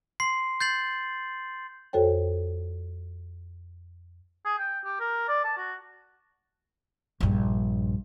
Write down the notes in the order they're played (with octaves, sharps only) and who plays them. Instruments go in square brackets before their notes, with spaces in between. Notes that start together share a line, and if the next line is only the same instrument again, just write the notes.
[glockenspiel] C6 C7
G6 A6 C7 F#7
[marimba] F2 F#4 A4 C5 C#5 G5
[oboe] G#4
G5
G4
A#4
D5
A5
F#4
[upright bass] A#1 G2